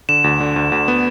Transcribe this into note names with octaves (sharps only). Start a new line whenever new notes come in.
D3 E7
D2
D3
D2
D2
B3